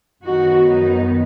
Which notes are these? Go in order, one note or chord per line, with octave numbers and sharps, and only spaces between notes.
F#2 D#3 F#3 B3 D#4 F#4
D#4